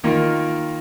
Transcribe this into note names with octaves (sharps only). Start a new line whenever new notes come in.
D#3 A#3 F4